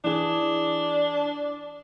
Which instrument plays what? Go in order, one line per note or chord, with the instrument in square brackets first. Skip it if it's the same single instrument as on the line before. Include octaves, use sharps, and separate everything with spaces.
[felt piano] E3 G#4 [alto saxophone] D4